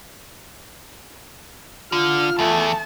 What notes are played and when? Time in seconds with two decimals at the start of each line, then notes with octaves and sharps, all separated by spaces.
1.92 D3 F4 F6
2.39 E2 A3 A5